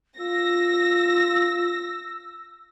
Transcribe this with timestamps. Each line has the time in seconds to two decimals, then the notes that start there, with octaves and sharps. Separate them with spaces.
0.20 F4 E6 A#6